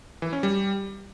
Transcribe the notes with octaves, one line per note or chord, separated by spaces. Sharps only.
E3
C#4
G3